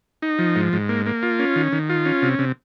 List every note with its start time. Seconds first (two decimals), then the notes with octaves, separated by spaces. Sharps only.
0.22 D#4
0.39 F3
0.56 G#2
0.73 G#2
0.89 A#3
1.06 A#3
1.23 F4
1.39 C#4
1.56 D#3
1.72 D#3
1.89 F4
2.06 C#4
2.22 C3
2.39 C3